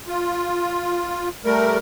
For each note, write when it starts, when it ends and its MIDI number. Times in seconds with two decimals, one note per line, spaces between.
0.08 1.29 65
1.45 1.78 55
1.45 1.78 57
1.45 1.78 70